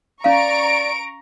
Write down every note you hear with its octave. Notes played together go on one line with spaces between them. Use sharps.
C#4 D5 F5 A#5 C#6 D7